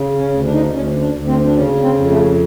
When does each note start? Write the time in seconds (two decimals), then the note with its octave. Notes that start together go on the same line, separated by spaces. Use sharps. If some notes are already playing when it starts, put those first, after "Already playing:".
Already playing: C#3
0.18 C#4
0.32 D2
0.45 D4
0.53 D#4
0.61 D4
0.73 D2 C#4
1.00 D4
1.13 D2
1.27 C4
1.46 D4
1.55 C#3 C#4
1.83 C4
1.95 F2
2.10 A3